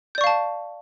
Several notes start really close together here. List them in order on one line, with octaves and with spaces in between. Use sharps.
G6 D5 C#6 F5 A5